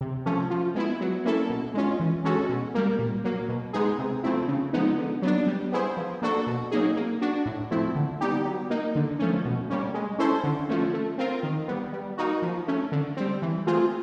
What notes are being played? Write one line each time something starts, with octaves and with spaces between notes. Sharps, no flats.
C3
F3 A3 C#4
F3
G#3 B3 E4
F#3
A#3 C#4 E4 A4
B2
G#3 C#4 F4
E3
G#3 C#4 F#4 A4
B2
G3 A#3
A#2
F#3 A#3
B2
G#3 B3 D#4 G#4
C3
F3 A3 C4 E4
C#3
F3 G#3 B3 D#4
D3
F#3 B3 D4
G3
B3 E4 G#4 C5
F3
A#3 D4 F#4 A4
B2
F#3 A#3 D#4 G#4
A#3
D4 F#4
A2
F3 A3 C4 E4
D3
G3 B3 D#4 G4
F#3
A#3 D#4
D3
F3 A3 C#4
B2
G3 A#3 C#4
G#3
C#4 E4 A4 C5
D3
F3 A3 C#4
A3
C4 F4 A#4
D#3
G3 B3
G3
A#3 D#4 F#4
F3
A3 C#4
D3
G3 C4
E3
A3 C4 F4 G#4